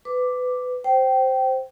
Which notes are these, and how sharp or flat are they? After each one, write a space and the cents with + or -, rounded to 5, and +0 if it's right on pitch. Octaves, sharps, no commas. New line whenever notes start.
B4 +20 D6 +0
C5 +0 G5 -20